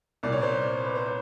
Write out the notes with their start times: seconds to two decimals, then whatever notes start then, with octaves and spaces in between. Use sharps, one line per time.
0.23 C2 A#2 D5
0.32 C#5
0.41 C5 D5
0.85 B4
0.95 C5
1.06 B4 C#5